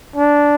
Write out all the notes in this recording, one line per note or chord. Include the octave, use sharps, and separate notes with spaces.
D4